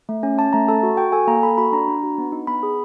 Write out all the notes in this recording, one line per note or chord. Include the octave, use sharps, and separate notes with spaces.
A3
C#4
C#4 A5
A3 A#5
A4 A5
F#4
F#4 G5
A4 G#5
A#3 A#5
A4 B5
F#4 B5
D4 A#5
D4
F#4
B3
D#4
B3 B5
G#4